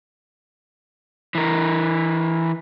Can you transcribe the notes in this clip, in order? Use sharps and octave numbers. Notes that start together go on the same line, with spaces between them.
E3 A#4